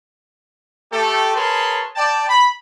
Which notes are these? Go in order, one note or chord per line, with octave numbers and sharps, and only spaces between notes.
A3 G4 A4
G#4 A#4 B4 C#5 A5 C6
D5 G5 A5
B5